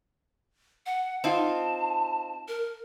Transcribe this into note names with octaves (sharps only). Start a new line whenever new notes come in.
F#5
C4 D#4 F4 A5
A#4